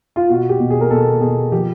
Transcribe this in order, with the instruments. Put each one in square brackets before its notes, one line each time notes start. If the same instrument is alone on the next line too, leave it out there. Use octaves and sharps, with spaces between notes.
[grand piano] F4
B2 F#4
G4
B2
G#4
A#4
B2 A4
B2 G#4
F3 G4